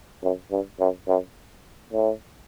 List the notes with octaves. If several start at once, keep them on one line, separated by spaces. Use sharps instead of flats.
F#2
G2
F#2
F#2
A2